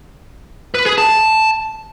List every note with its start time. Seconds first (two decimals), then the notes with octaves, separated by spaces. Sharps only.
0.75 B4
0.86 G#4
0.98 A5